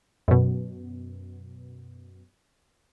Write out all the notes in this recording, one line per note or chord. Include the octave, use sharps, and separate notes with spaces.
F#2 B2